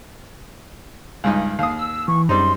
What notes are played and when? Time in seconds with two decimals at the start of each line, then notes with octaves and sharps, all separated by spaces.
1.24 C#2 G2 D#4
1.59 D#2 F5 D#6
1.79 E6
2.08 E3 C#6
2.29 F#2 G3 C4 D#4 C6